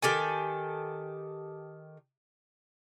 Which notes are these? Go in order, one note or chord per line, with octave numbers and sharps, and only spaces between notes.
D#3 G4 A4 G#5